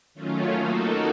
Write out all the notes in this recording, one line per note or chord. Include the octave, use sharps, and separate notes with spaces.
D#3 F#3 A3 C#4 F4
A#3 D#4 F#4 A4